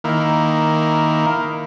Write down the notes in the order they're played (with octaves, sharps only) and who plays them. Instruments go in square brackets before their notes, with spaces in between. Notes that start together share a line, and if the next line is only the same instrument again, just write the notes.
[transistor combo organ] D#3 A#3 E4